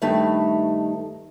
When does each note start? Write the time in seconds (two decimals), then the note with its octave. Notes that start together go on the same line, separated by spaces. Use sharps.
0.02 G2 D#3 A3 D#4 E5